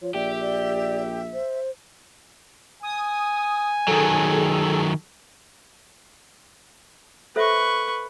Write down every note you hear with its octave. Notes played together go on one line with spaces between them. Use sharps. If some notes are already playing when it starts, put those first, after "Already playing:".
F3 C#5
A#1 G4 D5 E5
D5
C5
G#5 D#6
D#3 F#3 G#4 A4
A4 B4 C5 E5 C#6